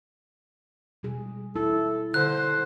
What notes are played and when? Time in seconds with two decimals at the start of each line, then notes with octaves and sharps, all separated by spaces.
1.03 B2 G3 G#4
1.56 E4 A4
2.14 D3 C5 F#6